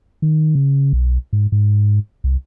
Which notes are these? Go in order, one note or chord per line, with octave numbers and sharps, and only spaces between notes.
D#3
C#3
B1
G#2
G#2
C2